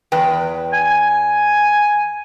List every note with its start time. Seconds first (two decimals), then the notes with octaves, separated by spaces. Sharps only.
0.12 E2 B4 G5
0.73 G#5